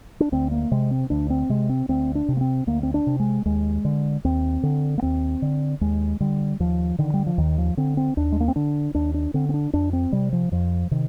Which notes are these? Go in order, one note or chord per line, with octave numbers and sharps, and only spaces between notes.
D4
D2 C4
A#3
C3 G#3
C4
D2 D4
C4
C3 G#3
C4
D2 C4
D4
C3
A#3
C4
D2 A#3
C4
D4
C3
G#3
D#2 G#3
D3
D#2 C4
D3
A#3
D#2 C4
D3
D#2 G#3
D3 G3
D#2 F3
D3 D#3
G3
F3
D#2 D#3
F3
D3 C4
C4
D#2 D4
G#3
A#3
C4
D3 D4
D#2 D4
D4
D3 C4
C4
D4
F2 D4
C4
C3 G3
F3
F2 F3
C3 D#3